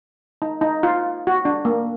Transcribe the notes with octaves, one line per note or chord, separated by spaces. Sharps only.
D#4
D#4
F4
F#4
D4
A#3